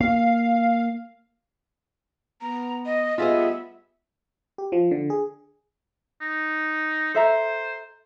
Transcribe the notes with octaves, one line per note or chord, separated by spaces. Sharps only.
A#3 F5
B3 A#5
D#5
A2 G3 B3 F4 G#4 D#5 E5
G4
F3
D3
G#4
D#4
A4 C5 E5 A#5